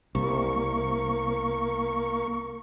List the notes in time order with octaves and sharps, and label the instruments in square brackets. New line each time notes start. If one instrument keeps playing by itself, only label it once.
[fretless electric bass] C2 [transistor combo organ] A#3 C#6